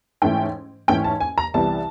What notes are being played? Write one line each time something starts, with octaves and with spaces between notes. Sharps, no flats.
G#2 E3 A3 C#4 G5
G#2 E3 A3 C#4 G5
A5
G#5
A#5
C2 C3 E3 G3 B3 A5